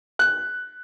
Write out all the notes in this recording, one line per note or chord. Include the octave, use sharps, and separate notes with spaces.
F#6